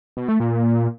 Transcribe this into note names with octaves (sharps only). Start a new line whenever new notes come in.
B2
A3
A#2